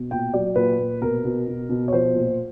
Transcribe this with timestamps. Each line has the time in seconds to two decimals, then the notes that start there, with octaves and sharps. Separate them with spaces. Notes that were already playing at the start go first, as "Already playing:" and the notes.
Already playing: B2
0.10 A#2 G5
0.34 F#3 D5
0.56 A#2 B4
0.79 A#2
1.01 B2 A#4
1.25 B2
1.47 B2
1.69 B2
1.88 C#5
1.92 F3 C5
2.15 A#2